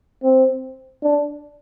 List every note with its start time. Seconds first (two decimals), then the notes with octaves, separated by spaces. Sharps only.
0.24 C4
1.03 D4